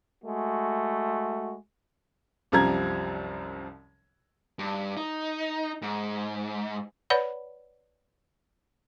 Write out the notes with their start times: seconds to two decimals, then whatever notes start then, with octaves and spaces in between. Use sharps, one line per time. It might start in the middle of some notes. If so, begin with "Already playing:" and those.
0.23 G#3 A3 F#4
2.52 C2 F#2 F3 G3 A#5 G#6
4.59 G2
4.97 D#4
5.82 G#2
7.10 B4 C#5 D5 F#5 B5